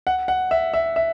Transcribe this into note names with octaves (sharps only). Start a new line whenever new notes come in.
F#5
F#5
E5
E5
E5